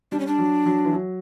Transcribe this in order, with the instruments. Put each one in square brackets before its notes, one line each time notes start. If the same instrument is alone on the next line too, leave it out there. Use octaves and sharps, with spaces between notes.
[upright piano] G3 [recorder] D4
[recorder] C#4
D4
[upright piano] F#3
F#3
E3
F#3